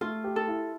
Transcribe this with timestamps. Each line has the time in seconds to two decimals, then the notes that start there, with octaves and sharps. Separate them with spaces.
0.01 A3 F4
0.24 G4
0.36 A4
0.48 E4